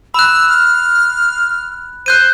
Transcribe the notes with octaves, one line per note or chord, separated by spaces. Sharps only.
B5 E6 F#6
F6
C5 F#6 G6 D#7